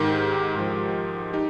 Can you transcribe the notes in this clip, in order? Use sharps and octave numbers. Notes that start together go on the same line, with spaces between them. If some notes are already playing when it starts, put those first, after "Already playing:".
Already playing: G#2 D#3 G4 A#4
G#2 F3
D#4 G4